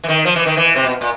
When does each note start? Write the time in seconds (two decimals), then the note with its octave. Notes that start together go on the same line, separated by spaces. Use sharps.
0.04 E3
0.08 D#3
0.25 F3
0.35 E3
0.46 D#3
0.57 E3
0.76 C3
0.84 B2
1.01 A#2